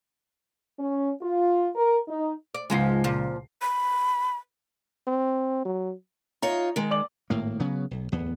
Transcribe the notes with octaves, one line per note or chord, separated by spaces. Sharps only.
C#4
F4
A#4
D#4
D5
C#2 G#2 F3 G#3 F5 C7
A#2 F3
B5
C4
F#3
D#4 F4 C#5 A#5
D#3 G#3
D5 D6 F#7
G#1 A2 A#3
C#3 F#3 B3
B1
D1 E2 B3